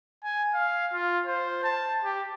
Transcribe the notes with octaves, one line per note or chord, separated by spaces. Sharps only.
G#5
F5
F4
C5
A5
G4